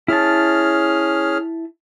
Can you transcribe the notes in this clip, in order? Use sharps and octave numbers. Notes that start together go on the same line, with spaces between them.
C#4 E4 G#4 A5 F6